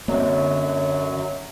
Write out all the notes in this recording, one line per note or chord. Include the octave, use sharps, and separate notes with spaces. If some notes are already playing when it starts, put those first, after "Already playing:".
F#2 D3 F#3 A#3 C4 C#5 D#5 E5